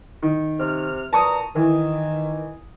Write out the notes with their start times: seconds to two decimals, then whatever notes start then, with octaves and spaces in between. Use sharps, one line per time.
0.23 D#3
0.59 C3 F6
1.13 A#2 B4 A5 A#5 C#6 D#6
1.56 D#3 E3